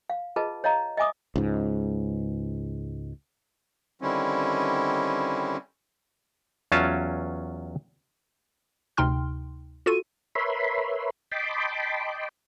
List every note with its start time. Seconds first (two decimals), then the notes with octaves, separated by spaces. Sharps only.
0.10 F5
0.36 F4 G#4 B4 D#5 A5
0.64 C#5 D#5 F5 A#5
0.97 D#5 E5 G#5 D6 D#6
1.36 C#2 G#2
4.02 D3 D#3 G3 C4 C#4 E4
6.72 E2 F#3 C#4 F4 A5
8.97 D2 C3 D#4 G5 C6 F6
9.86 F4 F#4 A4 D#7
10.35 A#4 B4 C#5 E5 B5 C6
11.32 D#5 G5 A5 B5 C6 D6